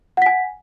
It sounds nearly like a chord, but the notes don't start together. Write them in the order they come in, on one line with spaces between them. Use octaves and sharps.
F#5 B6 G#5